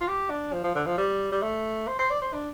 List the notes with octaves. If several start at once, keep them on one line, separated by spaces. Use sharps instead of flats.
F4
G4
D4
F3
F3
D3
F3
G3
G3
A3
C5
C5
D5
C5
D4